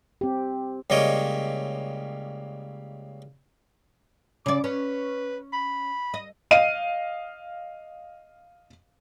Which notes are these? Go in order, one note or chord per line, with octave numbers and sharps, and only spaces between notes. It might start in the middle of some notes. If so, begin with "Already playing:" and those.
C4 G4
C#2 G3 A#3 C#5 D#5 G5
C#3 D5 D6
C#4 B4
B5
D#5
D#5 F5 D#7